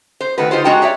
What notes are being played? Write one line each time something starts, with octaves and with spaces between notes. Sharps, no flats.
C5
D#3 A3 F#4 B4
D3 D#4 F4 G4 C5
G#3 D4 F#4 G5 A#5
G4 C#5 D5 E5